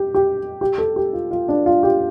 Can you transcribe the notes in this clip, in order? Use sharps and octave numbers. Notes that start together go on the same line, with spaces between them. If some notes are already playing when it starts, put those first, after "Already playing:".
Already playing: G4
G4
G4
A4
G4
F4
F4
D4
F4
G4